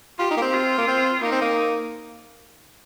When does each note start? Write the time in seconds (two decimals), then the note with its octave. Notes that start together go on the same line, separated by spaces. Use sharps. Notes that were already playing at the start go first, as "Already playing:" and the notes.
0.19 F4 G4
0.31 D#4
0.37 A#3
0.42 C4
0.53 F4
0.78 A#3
0.88 C4
1.22 A#3 D#4
1.32 C4
1.41 A#3